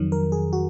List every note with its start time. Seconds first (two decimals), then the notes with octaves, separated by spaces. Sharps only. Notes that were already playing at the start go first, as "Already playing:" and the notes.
Already playing: F2 D#3 F#3
0.12 A#4
0.32 G#4
0.53 F#4